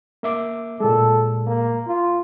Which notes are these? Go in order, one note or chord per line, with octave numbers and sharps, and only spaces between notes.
A#3 E5 D6
A#2 G#3 A4
A#3
F4